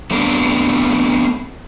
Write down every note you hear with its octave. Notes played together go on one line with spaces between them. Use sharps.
A3 B3 C4 D4 A#4